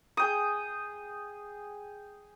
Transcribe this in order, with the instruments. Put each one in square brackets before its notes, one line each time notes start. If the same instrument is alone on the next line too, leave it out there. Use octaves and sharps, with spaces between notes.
[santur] G#4 G5 D#6